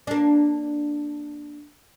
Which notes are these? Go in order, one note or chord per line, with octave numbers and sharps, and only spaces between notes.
A#3 D4